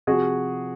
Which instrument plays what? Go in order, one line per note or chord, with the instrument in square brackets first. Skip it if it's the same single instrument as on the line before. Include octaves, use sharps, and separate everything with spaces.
[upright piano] C3 F3 F#4 G#4